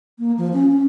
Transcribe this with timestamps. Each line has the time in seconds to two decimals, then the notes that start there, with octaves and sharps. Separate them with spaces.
0.19 A#3
0.38 F3
0.53 C#4
0.72 C#4